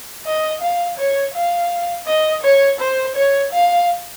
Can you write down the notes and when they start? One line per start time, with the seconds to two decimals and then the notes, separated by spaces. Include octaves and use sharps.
0.26 D#5
0.62 F5
0.98 C#5
1.35 F5
2.07 D#5
2.43 C#5
2.80 C5
3.16 C#5
3.52 F5